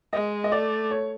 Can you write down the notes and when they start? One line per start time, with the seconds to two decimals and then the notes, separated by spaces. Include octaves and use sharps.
0.13 G#3 D#5
0.44 D#5
0.52 A3 D5
0.91 C#5